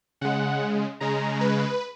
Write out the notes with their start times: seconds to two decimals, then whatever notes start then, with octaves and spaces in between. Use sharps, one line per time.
0.21 C#3 G#3 F#5
1.00 C#3 G#3 A#5
1.41 B4